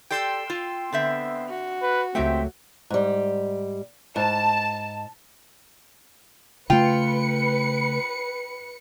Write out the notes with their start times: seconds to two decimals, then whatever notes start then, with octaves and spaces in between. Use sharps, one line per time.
0.11 G4 A4 D5 G5 C6 E6
0.50 F4
0.93 D3 B3 C4 E5
1.48 F#4
1.82 B4
2.15 C#2 F#3 A3 C4 G4 E5 G5
2.90 G#2 G3
4.16 G#2 A5
6.70 C#3 A3 F4 B4 G5 C#7